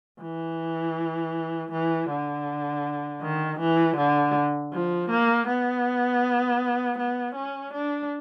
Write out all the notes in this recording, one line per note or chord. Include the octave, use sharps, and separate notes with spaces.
E3
E3
D3
D#3
E3
D3
F3
A#3
B3
B3
C#4
D4